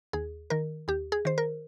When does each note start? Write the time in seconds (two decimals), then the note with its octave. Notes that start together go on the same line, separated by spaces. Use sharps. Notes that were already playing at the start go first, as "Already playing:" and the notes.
0.13 D#2 G#4
0.50 D#3 A#4
0.88 D#2 G4
1.12 G#4
1.25 D#3 C5
1.38 A#4